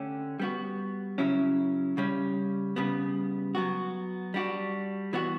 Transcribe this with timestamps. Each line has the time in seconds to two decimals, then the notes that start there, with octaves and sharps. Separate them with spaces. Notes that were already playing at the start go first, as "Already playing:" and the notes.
Already playing: D3 A3 C#4 G4
0.40 G3 B3 F#4
1.18 C#3 F#3 C#4 E4
1.97 C#3 G3 C#4
2.76 C#3 G3 B3
3.55 F#3 B3 F#4
4.34 G3 D4 F#4
5.13 E3 B3 D4 F#4